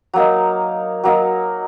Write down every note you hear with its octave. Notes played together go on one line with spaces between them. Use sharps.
F#3 A#3 D#4
F#3 A#3 D#4